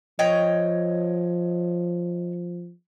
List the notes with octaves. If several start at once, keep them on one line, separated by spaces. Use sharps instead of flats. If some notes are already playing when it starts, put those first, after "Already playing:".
F3 C#5 D#5 G5